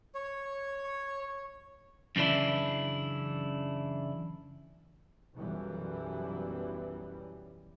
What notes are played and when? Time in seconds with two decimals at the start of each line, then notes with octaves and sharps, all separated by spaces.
0.15 C#5
2.16 F#2 C#3 E3 D4 E4
5.34 B1 F#2 E3 G3